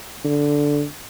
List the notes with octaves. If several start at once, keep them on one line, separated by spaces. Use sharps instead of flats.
D3